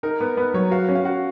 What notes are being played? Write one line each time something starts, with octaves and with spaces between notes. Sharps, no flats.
D#4 A#4
B3
B3 B4
F#3 C#5
F#4 F5
C#4
F5
F#4 F#5